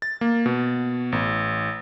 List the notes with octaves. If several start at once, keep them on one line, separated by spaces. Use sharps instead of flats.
A6
A#3
B2
A1